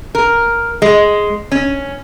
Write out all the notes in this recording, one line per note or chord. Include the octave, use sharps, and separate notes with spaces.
A#4
G#3
C#4